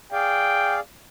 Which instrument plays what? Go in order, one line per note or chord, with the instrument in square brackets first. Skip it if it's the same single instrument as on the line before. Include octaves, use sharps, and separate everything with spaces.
[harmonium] G#4 D5 F5 [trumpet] G5